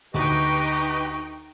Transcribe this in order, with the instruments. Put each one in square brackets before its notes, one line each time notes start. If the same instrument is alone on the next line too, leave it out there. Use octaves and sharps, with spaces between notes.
[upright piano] D2 [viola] D#4 G5 [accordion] G4 B4 D#5 [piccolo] C#6